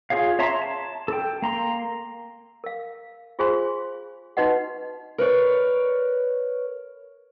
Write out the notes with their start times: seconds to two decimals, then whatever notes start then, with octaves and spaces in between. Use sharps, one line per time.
0.10 F4 G#4 C#5 F5
0.39 C#5 E5 A5 A#5 C6
0.62 A5
1.08 A4 G5
1.42 A#3 A#5 C6
2.64 A#4 F5
3.39 F4 G#4 C5 F5 G#5 C6
4.37 D#4 F#4 B4 D#5 F#5
5.18 A#4 B4 C#5 D5